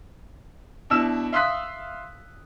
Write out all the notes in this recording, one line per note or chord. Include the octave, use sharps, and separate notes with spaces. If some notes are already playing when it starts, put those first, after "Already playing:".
B2 D4 E4 E6 E7
E5 F5 C6 D#6 F#6 B6